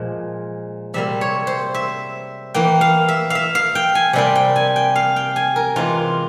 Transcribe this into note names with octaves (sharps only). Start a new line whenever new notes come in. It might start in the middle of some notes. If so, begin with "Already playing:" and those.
Already playing: A#2 F3 G#3
C3 G3 A#3 E5
C#5
C5
E5
E3 A#3 G5
F5
E5
E5 F5
F5
G5
G#5
C3 G3 A#3 G5
G5
G#5
G5
F5
G5
G#5
A#4
C3 E3 G#3 F4